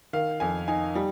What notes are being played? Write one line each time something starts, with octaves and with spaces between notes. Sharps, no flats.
D#3 F5
F2 G#5
D#4 G#5
G3